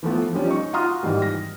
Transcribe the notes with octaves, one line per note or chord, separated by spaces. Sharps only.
E3 F3 A3 B3
F3 G3 C#4
D#4 C#6
F4 F#4 A#5 C6 D#6 F6
G#2 D#3 E3 G3
A#6